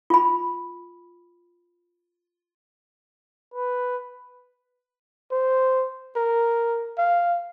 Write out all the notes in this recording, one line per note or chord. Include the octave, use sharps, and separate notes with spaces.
F4 B5
B4
C5
A#4
F5